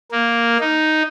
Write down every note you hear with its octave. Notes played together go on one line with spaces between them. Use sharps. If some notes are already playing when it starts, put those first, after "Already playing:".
A#3
D#4